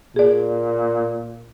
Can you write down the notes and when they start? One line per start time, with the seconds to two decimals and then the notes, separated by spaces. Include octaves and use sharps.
0.16 A#2 G#4 D5